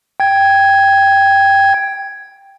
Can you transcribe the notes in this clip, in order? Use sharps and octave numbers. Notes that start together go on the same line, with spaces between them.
G5 G#6